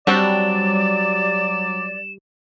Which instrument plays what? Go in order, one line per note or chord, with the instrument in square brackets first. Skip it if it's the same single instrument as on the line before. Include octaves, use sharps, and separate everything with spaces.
[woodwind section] F#3 D5 [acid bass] G3 [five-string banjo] C4 D4 F#4 [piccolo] E7